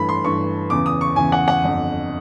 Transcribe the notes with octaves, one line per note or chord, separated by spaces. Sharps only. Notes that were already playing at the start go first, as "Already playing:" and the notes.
Already playing: G2 E3 A3 B5
C6
G2 E3 A3 C#6
E2 C#3 E3 D6
D#6
C#6
E2 C#3 E3 G#5
F#5
F#5
G1 F2 D3